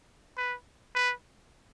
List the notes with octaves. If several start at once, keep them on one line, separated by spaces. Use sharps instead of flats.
B4
B4